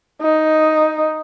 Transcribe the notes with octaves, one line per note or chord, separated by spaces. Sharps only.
D#4